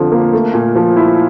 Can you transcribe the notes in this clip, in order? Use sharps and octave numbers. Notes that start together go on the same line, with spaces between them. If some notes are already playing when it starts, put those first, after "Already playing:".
Already playing: F2 D3 F3
A#3
A3
A#2
F3
E4